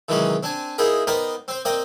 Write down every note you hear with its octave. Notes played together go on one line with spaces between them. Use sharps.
C3 D#3 E3 F#3 G#3 C#4
C4 D4 G#5
A#3 D#4 E4 G#4 A#4 G5
B3 D#4 A#4 C5 D5 G5
C4 C5
A#3 C4 D5 D#5 G5